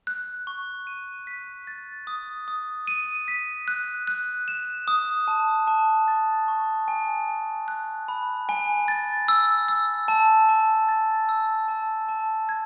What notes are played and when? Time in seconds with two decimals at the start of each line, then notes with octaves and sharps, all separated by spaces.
0.07 F#6
0.47 C#6
0.87 D#7
1.27 B6
1.67 A6
2.07 D#6
2.48 D#6
2.87 D#7
3.28 B6
3.68 F#6
4.07 F#6
4.48 E7
4.88 D#6
5.28 A5
5.68 A5
6.08 A6
6.48 C#6
6.88 G#5
7.28 G#5
7.68 F#6
8.08 B5
8.49 G#5
8.88 A6
9.28 E6
9.68 E6
10.08 A5
10.49 A5
10.89 A6
11.29 E6
11.68 A5
12.08 A5
12.49 G#6